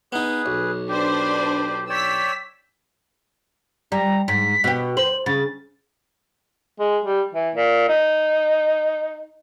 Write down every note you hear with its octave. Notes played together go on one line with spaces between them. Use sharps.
B3 D#4 G#4 B4
B1
D4 G4 B4 C5
C#5 D5 G5 E6 B6
G3 A#5
G#2 B6
B2 G4
C5 F#7
C#3 A6
G#3
G3
E3
A#2
D#4